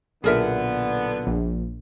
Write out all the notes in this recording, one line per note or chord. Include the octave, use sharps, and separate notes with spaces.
B1 A#2 D3 B3 G#4 A#4 E5
A#1